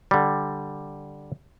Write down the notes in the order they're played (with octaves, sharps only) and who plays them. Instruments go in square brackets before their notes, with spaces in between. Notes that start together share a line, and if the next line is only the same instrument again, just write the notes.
[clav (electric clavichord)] D3 G3